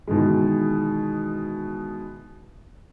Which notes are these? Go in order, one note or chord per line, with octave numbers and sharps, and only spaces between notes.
B2 D#3 E3 G#3